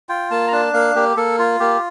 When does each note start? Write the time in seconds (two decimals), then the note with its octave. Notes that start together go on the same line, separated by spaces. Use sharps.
0.09 F4 G5
0.31 A#3 A5
0.48 A#5
0.52 D4 A5
0.74 A#3 F5
0.95 A#3 G4
1.17 A#3 A4
1.39 F4
1.60 A#3 G4